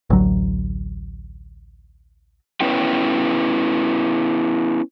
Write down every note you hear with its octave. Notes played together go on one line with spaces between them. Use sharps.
A1 D2 F#3
B3 C#4 E4 B4 C#5 G5